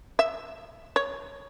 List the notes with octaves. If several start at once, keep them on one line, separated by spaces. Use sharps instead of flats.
E5
C#5